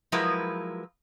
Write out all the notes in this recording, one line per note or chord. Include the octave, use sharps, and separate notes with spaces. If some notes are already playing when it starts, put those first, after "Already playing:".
F3 F#3 G#3 E4 A#4 B4